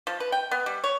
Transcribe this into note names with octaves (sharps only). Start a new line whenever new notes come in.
F3
B4
G5
B3
G3
C#5